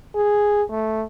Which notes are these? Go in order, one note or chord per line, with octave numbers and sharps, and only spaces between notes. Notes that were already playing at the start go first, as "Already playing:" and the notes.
G#4
A3